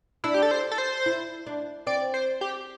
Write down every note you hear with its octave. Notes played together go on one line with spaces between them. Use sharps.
D4 E4
G4
A4
C5
A4
C5
E4
D4
C4 D5
C5
G4